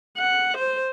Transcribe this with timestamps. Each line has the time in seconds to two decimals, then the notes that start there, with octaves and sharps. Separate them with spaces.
0.18 F#5
0.58 C5